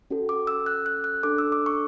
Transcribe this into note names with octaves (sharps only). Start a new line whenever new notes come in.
C#4 F#4 A4
D6
E6
F#6
F#6
F#6
D4 A4 D6
E6
D6
C#6